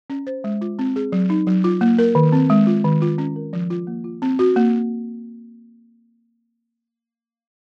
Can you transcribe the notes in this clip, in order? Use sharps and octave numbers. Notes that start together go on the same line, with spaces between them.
C#4
C5
G#3
F4
C4
G#4
F#3
D#4
F#3
F4
A#3
A#4
D#3
C4
G#3
F4
D#3
F4
C#4
A#4
F3
F4
A#3
F4
C4
F#4
A#3